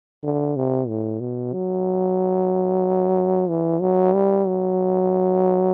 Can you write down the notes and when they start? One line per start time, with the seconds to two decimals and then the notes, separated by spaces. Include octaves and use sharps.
0.23 D3
0.56 C3
0.88 A2
1.20 B2
1.53 F#3
3.49 E3
3.81 F#3
4.14 G3
4.47 F#3